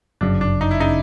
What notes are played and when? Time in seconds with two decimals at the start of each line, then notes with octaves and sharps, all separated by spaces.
0.21 G1 F#2 C#3 D4
0.41 D4
0.61 D#4
0.71 E4
0.80 C#3 D#4